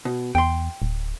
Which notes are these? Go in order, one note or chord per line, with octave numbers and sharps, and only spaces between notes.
B2
E2 G5 C6
D1